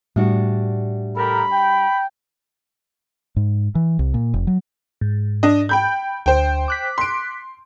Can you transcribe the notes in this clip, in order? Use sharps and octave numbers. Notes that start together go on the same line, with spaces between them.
A2 G3 D4 F#4
G4 A4 A#4 B5
G5
G#2
E3
C2
A#2
F1
F#3
G#2
D4 D#5
G5 B5 G6
D2 C5 G5
D6 F#6 B6
C6 D7